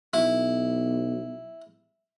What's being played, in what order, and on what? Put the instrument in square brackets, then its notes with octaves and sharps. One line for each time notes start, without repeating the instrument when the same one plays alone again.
[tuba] B1 [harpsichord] E4